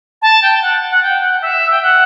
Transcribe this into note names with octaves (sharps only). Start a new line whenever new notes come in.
A5
G5
F#5
F#5
G5
F#5
E5
G5
F#5